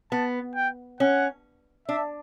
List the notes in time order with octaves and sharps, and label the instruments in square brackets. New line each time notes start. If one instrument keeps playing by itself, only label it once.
[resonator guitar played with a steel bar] B3 [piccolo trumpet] A5
[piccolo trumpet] G5
[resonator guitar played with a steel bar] C#4 [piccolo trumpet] F#5
[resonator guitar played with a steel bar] D4 [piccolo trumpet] E5